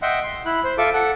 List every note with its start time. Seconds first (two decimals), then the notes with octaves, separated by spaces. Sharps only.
0.02 D#5 E5 F#5 G5 C6
0.24 C6
0.46 E4 F#6
0.64 C5
0.78 F4 A4 E5 D6
0.93 A4 F#5